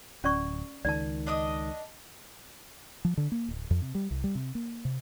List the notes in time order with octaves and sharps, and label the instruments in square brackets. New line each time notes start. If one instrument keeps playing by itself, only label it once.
[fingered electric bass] D1 [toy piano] C#4 D5 C#6
[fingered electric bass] C#2 D#3 [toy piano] D5 A5
[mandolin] D4 D#5 D#6
[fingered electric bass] F3
D3
A#3
D1
F2
C3
G3
C2
G3
C3
A#3
C3